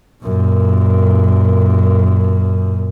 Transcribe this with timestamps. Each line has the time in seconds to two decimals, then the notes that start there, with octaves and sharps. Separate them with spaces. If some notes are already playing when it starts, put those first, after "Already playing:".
0.24 F#2 A#2